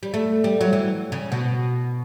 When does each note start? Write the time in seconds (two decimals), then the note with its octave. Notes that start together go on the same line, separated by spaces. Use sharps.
0.03 G3
0.14 A3
0.44 G3
0.61 F#3
0.73 E3
1.12 C#3
1.32 B2